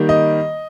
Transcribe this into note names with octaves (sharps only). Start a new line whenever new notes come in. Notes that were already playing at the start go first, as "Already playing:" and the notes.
Already playing: D#3 G3 A#3
D#5